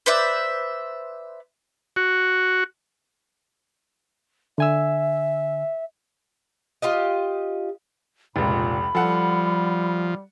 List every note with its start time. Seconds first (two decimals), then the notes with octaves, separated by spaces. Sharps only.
0.06 B4 C5 D5 E5
1.96 F#4
4.58 D3 E5 G#5 E6
6.82 F4 G4 D#5
8.36 F1 C#2 A#2 B5
8.95 F3 G3 A4 F#5